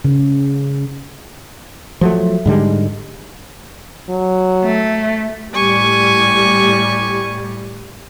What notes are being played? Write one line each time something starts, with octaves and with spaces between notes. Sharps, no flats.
C#3
F3 F#3 A3
G#2 D3 G3 G#3
F#3
A3
A2 G3 G#5 C#6